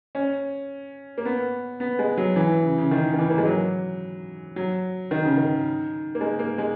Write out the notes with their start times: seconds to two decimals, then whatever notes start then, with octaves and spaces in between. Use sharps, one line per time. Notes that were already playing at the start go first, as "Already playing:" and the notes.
0.15 C#4
1.18 A#3
1.25 B3
1.80 B3
1.99 G#3
2.17 F#3
2.36 E3
2.63 C#3
2.78 C#3
2.91 D#3
3.13 D#3
3.18 E3
3.30 A#3
3.38 G#3
3.46 F#3
4.56 F#3
5.11 D#3
5.25 C#3
5.37 D#3
6.15 A#3
6.21 G#3
6.39 A#3
6.58 G#3